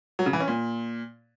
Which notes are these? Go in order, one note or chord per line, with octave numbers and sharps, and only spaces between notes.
F#3
C#3
E3
C#4
A#2